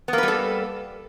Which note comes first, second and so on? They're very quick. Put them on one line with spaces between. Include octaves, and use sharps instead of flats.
B3 A#3 B4 G3 A4